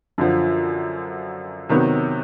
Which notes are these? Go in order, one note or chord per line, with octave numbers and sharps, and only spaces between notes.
F#2 D3 F3
C3 D#3 F#3 B3